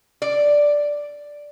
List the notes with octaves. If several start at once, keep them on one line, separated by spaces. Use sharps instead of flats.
D5